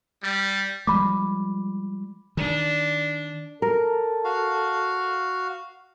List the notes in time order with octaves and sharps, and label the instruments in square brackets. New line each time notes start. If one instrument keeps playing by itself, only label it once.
[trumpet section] G3
[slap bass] F3 G3 G#3 [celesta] B5 D6
[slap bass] D#3 [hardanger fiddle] D4
[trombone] A4 [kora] A#4
[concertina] F#4 F5